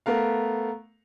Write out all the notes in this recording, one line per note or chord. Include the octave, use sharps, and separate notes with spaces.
A3 B3 A#4 F5